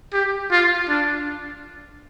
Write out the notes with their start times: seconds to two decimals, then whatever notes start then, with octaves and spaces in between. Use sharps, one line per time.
0.13 G4
0.51 F4
0.89 D4